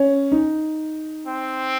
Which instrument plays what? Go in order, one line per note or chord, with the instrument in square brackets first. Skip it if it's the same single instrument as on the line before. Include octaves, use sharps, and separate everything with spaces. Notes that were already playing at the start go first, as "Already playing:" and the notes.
Already playing: [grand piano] C#4
D#4
[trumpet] C4